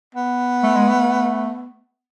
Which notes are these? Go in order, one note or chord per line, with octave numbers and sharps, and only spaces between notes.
B3
A3
G#3
A3